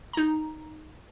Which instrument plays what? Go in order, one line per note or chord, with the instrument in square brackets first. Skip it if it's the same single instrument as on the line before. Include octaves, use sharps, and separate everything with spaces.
[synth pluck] D#4 A#5